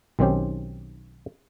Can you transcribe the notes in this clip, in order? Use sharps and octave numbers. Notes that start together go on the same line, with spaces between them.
B1 D#3 C4 C#4 G4 C5